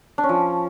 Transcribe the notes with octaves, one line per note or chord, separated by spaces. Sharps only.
D4
C#4
F3